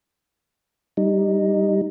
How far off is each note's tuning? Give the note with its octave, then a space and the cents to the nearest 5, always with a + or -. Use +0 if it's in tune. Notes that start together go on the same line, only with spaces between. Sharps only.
G3 +0 D#4 +0